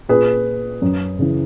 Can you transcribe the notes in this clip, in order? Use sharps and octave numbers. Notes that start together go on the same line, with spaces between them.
A#2 G#4 B4
F#2
C#3 E3